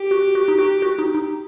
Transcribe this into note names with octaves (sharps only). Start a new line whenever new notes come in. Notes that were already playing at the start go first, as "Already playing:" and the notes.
Already playing: G4
F#4
F#4
D#4
F#4
F#4
D#4
D#4